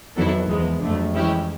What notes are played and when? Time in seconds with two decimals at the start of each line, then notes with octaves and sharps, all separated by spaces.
0.16 F2 D#3 F#3 B3 E4 A4
0.48 E2 F3 G#3 B3
0.81 F2 D3 F#3 A3
1.14 E3 G#3 C#4 E4 G4